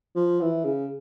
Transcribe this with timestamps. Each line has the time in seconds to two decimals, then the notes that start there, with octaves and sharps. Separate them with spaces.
0.16 F3
0.41 E3
0.65 C#3